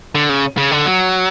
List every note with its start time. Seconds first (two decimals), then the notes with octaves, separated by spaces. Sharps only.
0.15 D3
0.29 C#3
0.57 C#3
0.71 D3
0.86 F#3